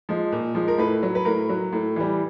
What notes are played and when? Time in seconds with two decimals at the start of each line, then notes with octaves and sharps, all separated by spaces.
0.09 F3 G#3
0.32 A#2
0.55 F3 G#3
0.68 A#4
0.78 A2 B4
1.03 F#3
1.15 B4
1.25 A2 A#4
1.49 F#3
1.73 A2
1.96 E3 G3